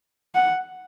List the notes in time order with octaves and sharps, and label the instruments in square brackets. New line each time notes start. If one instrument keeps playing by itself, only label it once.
[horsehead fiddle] F#5